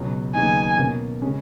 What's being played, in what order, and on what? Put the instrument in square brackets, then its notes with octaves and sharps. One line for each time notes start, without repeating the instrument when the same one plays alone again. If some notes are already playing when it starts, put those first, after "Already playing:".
Already playing: [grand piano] C#2 B2 F#3 C#4
[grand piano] D#2 C#3 F#3 B3 D#4 [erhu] G#5
[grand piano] B2 A#3 C#4
C#3 G#3 C#4